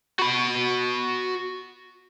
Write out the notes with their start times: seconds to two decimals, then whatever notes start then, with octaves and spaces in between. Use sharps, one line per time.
0.19 F#4 B5